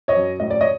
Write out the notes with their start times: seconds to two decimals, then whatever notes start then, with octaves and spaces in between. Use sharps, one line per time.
0.08 C#5 D#5
0.16 F#2
0.40 A2 D#5
0.50 D5
0.61 C#5 D#5